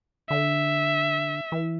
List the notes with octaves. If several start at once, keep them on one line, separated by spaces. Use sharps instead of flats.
D3 E5
E3